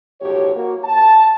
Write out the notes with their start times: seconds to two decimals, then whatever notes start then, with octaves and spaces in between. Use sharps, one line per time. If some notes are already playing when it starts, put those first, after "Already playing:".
0.21 B1 F2 A2 F#4 G4 C#5
0.55 A#3 F#4
0.84 A5